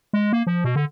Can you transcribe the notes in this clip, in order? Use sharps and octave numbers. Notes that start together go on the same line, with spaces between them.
G#3
A#3
F3
B2
D3